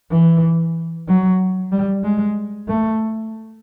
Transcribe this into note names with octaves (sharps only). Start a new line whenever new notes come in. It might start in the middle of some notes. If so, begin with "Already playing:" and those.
E3
F#3
G3
G#3
A3